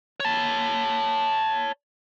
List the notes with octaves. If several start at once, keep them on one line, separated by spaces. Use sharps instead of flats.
C#5 A5